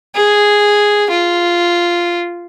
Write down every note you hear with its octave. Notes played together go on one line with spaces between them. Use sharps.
G#4
F4